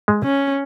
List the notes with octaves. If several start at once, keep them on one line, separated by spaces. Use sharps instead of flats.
G#3
C#4